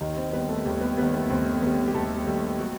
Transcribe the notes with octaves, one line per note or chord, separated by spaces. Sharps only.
D#2 D#3 D#4
C4 C5
D#3 G3 B3 B4
A3 A4
D#2 G3 G4
B3 B4
D#3 G3 B3 B4
A3 A4
D#2 C4 C5
D#3 G3 B3 B4
G4
D#2 A3 A4
D#3 G3
F#3 F#4